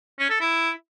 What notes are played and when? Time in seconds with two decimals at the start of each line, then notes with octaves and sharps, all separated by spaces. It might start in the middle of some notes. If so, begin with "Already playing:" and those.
0.19 C#4
0.30 A4
0.41 E4